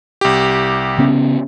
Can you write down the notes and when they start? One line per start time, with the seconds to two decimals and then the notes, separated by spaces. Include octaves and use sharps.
0.21 C2 G4
0.98 C#3 B3 C#4